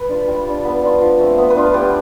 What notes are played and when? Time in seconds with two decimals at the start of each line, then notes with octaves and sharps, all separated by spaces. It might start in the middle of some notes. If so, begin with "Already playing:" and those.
Already playing: B4
0.09 D4 F4
0.28 G3
0.46 D4 F4
0.64 B3 B4
0.83 D4 F4
1.01 F3
1.20 A3 C4
1.38 B3 B4
1.50 B4
1.56 D4 F4
1.74 B3 G4